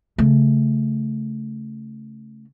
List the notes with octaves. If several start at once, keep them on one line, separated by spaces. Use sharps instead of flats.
C#3 A3